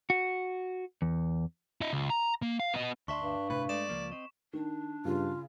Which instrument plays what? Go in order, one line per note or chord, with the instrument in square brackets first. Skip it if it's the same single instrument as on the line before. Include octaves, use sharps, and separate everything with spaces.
[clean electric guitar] F#4
E2
[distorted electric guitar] E4 D#5
C#2
A#5
A#3
F5
B3 D#5
[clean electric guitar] D2 E5 C6 [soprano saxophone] D4 [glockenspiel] C#6 B6
[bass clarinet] G2
[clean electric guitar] A2 C3 [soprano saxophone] B4
[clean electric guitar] G#3 A3 [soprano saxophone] D5 [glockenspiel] E7
[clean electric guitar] C#2 F3 A#3
C4 D#5
[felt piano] D#3 [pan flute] D4
[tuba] G2 [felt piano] C#3 [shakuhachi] F4